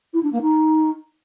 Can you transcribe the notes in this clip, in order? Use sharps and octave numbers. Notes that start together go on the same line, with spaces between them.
E4
D4
A#3
D#4